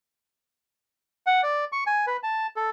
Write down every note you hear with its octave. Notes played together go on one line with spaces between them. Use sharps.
F#5
D5
C#6
G#5
B4
A5
A4